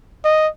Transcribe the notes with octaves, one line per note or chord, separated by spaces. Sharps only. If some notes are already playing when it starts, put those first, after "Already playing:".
D#5